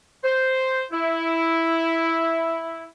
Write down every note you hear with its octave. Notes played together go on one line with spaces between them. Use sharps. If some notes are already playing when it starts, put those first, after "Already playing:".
C5
E4